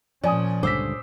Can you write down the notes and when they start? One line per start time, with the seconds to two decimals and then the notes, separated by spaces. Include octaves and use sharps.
0.24 A#2 F3 C#4 D5 G#5 D#6
0.63 C#2 G2 D3 C5 D6 E6 B6